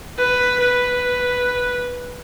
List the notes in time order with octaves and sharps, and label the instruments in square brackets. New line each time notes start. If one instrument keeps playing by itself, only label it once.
[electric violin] B4
B4